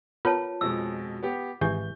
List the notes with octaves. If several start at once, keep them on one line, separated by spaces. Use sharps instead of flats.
B3 F4 A#4 C#5 A5
F2 B2 G#3 E6
B3 G4
G#1 E3 G4 G#4 G6